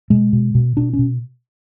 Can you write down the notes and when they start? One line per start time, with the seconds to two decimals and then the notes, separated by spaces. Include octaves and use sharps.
0.10 B2 G#3
0.33 B2
0.55 B2
0.77 B2 D4
0.93 C#4
0.99 B2